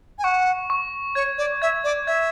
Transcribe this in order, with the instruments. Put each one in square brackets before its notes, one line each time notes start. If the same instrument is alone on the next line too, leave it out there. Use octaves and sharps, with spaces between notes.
[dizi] G#5
[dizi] F#5 [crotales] C#6
[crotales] C#6
[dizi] C#5 [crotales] G#6
[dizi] D5
[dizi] E5 [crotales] G#6
[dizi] D5
[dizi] E5 [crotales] G#6